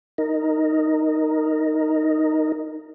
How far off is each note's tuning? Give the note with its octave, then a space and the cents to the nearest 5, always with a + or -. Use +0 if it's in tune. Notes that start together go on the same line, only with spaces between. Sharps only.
D#4 +0 A#4 -5